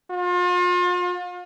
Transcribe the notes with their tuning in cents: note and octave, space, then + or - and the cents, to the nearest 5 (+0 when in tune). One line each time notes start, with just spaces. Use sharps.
F4 +40